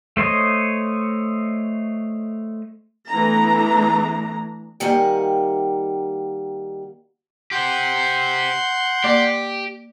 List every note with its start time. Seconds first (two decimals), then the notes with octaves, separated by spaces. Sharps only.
0.17 A3 C5 C#5 D#5
3.10 E3 A3 B3 D4 A#5
4.80 D#3 G3 A#3 F#5 G#5
7.51 G4 C5 F#5 C6 G6
9.04 A#3 G4 D5 D6